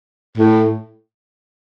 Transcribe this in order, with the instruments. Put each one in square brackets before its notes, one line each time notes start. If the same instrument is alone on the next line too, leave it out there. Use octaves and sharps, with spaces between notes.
[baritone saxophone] A2